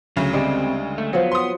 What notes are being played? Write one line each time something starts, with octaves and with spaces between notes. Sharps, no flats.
D2 C#3 F#3
G3 G#3 C4
A3
F3 F#3 B3
C6 D#6